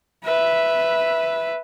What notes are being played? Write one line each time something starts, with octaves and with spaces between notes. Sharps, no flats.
B4 E5